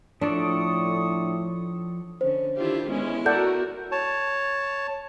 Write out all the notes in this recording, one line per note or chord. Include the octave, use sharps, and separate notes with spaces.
A2 F3 D4 A4 D5 C#6 D#6
D3 C#4 C5
D#3 D4 E4 F4 G4
G#3 B3 C#4 E4
F#4 A4 A#4 D5 F#5 G6
C#5 A5